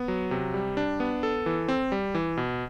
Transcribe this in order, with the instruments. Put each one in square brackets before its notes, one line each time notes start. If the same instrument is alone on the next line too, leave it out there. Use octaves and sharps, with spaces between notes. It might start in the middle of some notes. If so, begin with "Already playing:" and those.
Already playing: [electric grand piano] B3
F#3
C3
G3
D4
B3
A4
E3
C4
G3
E3
B2